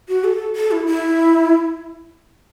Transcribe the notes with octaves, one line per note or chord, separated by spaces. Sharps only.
F#4
A4
A4
E4
E4